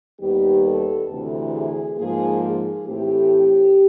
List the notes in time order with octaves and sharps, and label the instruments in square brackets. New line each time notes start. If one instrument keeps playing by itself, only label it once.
[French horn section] D#2 D#3 G3 B3 G4
A4
D2 C3 E3
G#4
G#2 F3 A#3 G#4
G#4
A2 E3 A3 C4 G4